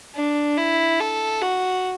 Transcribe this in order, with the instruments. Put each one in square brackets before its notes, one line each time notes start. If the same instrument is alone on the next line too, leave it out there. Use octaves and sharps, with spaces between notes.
[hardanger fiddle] D4
E4
A4
F#4